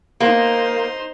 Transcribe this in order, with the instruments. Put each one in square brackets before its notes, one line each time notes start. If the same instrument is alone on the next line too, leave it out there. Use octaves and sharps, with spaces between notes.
[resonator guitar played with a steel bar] A#3 [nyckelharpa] D#4 C5